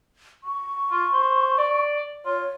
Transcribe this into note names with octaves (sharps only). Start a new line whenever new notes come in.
C#6
F4
C5
D5
F4 C#5